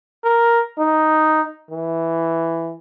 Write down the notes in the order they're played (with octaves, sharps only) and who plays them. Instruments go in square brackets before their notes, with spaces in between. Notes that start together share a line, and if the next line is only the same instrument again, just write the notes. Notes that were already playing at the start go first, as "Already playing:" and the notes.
[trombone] A#4
D#4
E3